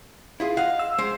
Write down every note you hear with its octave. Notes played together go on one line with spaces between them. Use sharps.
E4 F4 G#4
D#5 F5 F#5
E6
G#3 C5